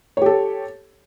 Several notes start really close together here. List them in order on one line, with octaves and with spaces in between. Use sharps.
C#5 G4 A4